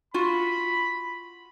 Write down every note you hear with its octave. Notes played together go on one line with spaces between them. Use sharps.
F4 F#4 B5